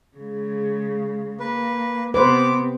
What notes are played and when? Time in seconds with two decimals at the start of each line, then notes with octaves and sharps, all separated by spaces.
0.17 C#3 G#3
1.40 A#3 B4
2.14 C3 B3 B4 C5 D6